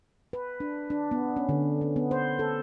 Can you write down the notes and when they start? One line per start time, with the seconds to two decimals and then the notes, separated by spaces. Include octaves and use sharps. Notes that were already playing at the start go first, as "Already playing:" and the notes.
0.33 B4
0.60 D4
0.90 D4
1.11 B3
1.36 C#4
1.49 D3
1.81 C#4
1.96 B3
2.11 C5
2.39 A4